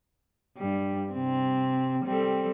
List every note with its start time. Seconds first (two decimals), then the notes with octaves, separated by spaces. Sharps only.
0.57 G2 G3
1.13 C3 C4
2.05 G3 C4 A4